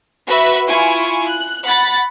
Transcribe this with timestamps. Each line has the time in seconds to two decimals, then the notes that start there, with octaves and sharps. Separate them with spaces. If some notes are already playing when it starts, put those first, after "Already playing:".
0.28 F#4 B4 E5
0.68 E4 F4 G#5 C#6
1.28 F#6
1.64 F#5 B5 A6